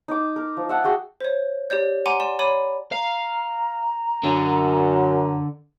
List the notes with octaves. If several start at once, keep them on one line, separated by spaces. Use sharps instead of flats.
D#4 D6
A#4
F3
E5 F#5 A5
F#4 G#4 G5
C5 C#5
G4 C#5 D5 G6
F#5 G#5 A#5 C6 D6 D#7
D5 C6 E7
C#5 D5 B5 D6 D#7
F5 A#5
F#2 D3